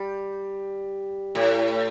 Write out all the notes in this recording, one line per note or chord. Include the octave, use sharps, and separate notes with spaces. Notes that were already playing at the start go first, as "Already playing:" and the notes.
Already playing: G3
A2